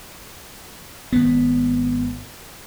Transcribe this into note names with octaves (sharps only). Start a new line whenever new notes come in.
G#1 B3